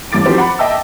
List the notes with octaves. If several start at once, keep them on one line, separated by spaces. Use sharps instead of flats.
A1 G2 D6 A6 D7
D#3 F3 F#3 C4 G4 C5
F#5 B5
D#5 E5 G5 A5 E6